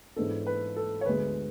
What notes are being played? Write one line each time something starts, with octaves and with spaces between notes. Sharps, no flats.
G#2 E3 G#3 B3 D4 A4
B4
A4
C#5
D2 D3 G#3 B3 B4